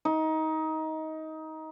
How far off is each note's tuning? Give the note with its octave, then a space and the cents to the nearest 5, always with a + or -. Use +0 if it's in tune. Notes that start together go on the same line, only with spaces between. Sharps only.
D#4 +20